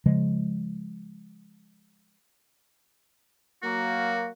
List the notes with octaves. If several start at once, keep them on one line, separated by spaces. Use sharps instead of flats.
C#3 F3 G#3
F#3 A#3 F#4